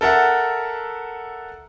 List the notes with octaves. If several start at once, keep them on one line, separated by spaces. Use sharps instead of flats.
A4 A#4 E5 F#5